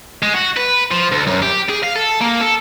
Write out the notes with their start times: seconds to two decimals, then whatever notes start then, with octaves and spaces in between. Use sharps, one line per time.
0.23 G#3
0.34 F#4
0.57 B4
0.92 F3
1.12 D2
1.27 F#2
1.42 G4
1.69 G#4
1.83 F5
1.96 A4
2.21 A#3
2.41 A4